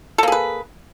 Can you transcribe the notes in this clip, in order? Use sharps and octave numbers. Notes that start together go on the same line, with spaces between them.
A#3 G#4 A4 B4